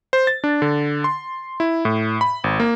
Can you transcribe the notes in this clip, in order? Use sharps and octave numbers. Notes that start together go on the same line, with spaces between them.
C5
A6
D4
D3
C6
E4
A2
B5
G#1
A#3